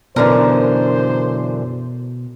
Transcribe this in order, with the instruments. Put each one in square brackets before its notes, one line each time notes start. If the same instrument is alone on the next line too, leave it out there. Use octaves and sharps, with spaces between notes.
[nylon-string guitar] F#2 D3 E3 [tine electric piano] B2 [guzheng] A#4 [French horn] C5